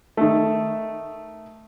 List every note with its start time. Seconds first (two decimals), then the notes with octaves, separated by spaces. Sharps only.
0.17 D#3 A3